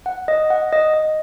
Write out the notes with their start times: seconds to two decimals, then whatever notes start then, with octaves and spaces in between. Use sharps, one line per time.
0.06 F#5
0.28 D#5
0.50 F#5
0.73 D#5
0.94 D#5